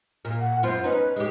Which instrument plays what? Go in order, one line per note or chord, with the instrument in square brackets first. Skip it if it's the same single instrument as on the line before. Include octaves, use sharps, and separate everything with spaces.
[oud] A#2
[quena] F#5
[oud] F#2 B3 F4 [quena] C5
[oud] C#4 D#4 [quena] B4
[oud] G#3 G4 [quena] G#4